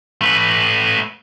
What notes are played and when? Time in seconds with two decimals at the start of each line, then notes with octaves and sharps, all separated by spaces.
0.21 A3 B4